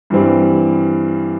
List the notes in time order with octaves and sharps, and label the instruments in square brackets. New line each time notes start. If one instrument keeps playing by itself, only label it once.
[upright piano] G2 E3 G3 C4